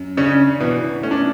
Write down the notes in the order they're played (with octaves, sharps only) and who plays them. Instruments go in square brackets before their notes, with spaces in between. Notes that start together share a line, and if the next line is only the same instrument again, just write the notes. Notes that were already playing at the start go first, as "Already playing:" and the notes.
Already playing: [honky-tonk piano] F#2
[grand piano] C#3 C#4 [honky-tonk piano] D4
[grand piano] B2 B3 [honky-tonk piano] E3
[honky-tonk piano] A3 [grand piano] C#4
[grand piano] D4